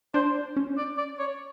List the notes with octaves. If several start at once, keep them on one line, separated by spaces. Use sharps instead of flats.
D4 C5
C#4
D5
D5
C#5